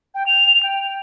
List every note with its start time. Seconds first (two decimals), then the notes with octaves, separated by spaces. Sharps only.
0.15 G5
0.27 F7
0.63 G5